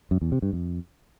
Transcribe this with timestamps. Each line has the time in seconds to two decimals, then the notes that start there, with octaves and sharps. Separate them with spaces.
0.11 F#2
0.22 E2
0.32 C3
0.42 G2
0.53 F2